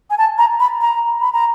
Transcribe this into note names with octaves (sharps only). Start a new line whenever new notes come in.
G#5
A5
A#5
B5
A#5
B5
A#5